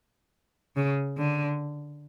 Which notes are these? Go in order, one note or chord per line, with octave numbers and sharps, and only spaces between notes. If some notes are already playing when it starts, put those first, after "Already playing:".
C#3
D3